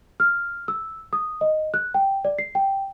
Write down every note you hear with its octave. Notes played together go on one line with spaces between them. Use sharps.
F6
E6
D#6
D#5
F#6
G5
D5
C7
G5